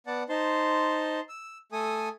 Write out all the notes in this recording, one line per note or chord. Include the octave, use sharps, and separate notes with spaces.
B3 D5 F#5 A5
D#4 C5 A5 C6
E6
A3 A4 G#5 D#6